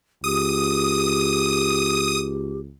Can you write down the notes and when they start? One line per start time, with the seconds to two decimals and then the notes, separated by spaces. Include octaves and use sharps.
0.24 C#2 G4 D#6